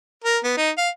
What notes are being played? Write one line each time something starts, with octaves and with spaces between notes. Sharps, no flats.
A#4
B3
D#4
F5